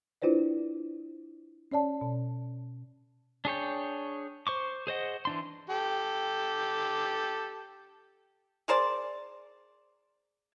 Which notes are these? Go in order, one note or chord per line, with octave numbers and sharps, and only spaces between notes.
D4 E4 F4 B4 C5 D5
C#4 C#5 D5 A5
B2
D4 G#4 C#5 G5
C5 C#6 D6
G#4 C5 D#5 F#5
E3 D4 C6
G4 A4
G#4 A#4 C5 D5